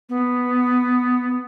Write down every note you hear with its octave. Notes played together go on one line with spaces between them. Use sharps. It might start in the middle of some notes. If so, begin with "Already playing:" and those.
B3